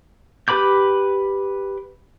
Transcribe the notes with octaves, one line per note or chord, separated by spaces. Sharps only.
G4 B4 B5 D6 G6